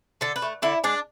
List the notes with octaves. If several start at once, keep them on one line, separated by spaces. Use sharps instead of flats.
D3 A4
B4
A3
D3 E4
G#3 D4